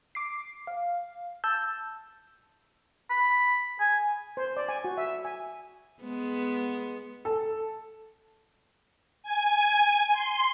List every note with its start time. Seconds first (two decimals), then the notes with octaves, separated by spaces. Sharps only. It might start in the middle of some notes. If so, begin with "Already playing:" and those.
0.15 D6 C7
0.67 F5
1.44 A5 E6 G6
3.10 B5
3.80 G#5
4.37 C5
4.57 D5
4.69 G#5
4.84 F#4
4.97 E5
5.25 G#5
6.02 G#3 B3
7.25 A4
9.23 G#5
10.12 C6